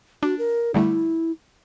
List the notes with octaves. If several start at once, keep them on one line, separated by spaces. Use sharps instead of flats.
D4 F#4
A#4
D3 G3 A3 E4